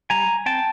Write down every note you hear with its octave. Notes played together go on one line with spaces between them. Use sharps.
G3 G#5 A#5
C4 G5 A5